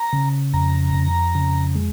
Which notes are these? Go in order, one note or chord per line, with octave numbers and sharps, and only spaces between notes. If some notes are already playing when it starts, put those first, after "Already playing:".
Already playing: A#5
C#3
F2 A#5
F2
C#3
G#3